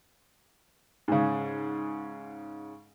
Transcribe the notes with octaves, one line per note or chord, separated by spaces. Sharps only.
G#2 C#3